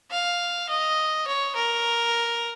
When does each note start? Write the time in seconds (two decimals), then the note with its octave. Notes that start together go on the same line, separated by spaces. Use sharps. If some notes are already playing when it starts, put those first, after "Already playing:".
0.11 F5
0.69 D#5
1.27 C#5
1.56 A#4